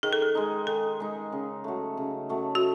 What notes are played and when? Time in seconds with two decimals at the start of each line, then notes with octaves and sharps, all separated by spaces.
0.03 D#3 G#4
0.13 A4
0.22 G#4
0.35 G#3 D#4
0.67 D#3 A4
1.00 G#3 D#4
1.32 C#3
1.64 F#3 A3
1.97 C#3
2.29 F#3 A3
2.55 F#4